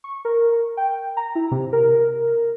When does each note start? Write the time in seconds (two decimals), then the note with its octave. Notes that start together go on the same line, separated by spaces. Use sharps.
0.04 C#6
0.25 A#4
0.77 G5
1.17 A#5
1.35 E4
1.51 C3
1.73 A#4